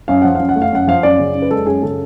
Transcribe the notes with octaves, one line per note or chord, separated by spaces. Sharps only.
F#2 F5
F3 F#5
F#2 F5
F#5
A3
F5
F#2 F#5
F3 F5
F#2 D5
C#3
F#2
B4
G#3 A4
F#2 G#4
C#3 A4